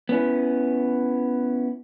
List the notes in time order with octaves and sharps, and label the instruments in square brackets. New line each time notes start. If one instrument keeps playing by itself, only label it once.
[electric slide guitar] B3 C#4 E4